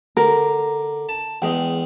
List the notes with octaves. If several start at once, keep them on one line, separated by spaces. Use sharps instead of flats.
D3 A#4
A5
E2 G#3 D#5 G5